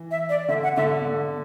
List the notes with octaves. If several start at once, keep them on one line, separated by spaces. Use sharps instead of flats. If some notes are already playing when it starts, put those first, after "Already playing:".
Already playing: E3
E5
D5
D3 E5
F#5
D3 E5
D3